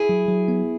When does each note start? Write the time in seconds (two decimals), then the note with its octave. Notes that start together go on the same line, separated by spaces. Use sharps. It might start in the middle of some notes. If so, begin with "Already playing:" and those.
Already playing: E4 G#4
0.09 F#3
0.28 F#3
0.48 B3